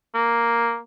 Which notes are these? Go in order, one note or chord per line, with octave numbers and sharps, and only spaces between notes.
A#3